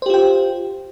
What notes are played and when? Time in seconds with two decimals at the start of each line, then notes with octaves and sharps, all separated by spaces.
0.02 C5
0.06 G4
0.10 F4
0.14 G5